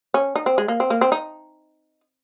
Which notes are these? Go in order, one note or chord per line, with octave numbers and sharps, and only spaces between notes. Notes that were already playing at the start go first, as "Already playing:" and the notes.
C#4
D#4
C4
G#3
A#3
C4
A#3
C4
D#4